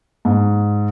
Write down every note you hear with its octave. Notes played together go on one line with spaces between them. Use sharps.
G#2